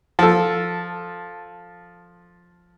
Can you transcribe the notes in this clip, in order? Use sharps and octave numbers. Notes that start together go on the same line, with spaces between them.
F3 A4